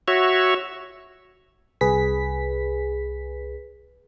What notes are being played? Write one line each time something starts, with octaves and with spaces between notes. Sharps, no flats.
F#4 C#5 E5
C2 G#4 B4 B6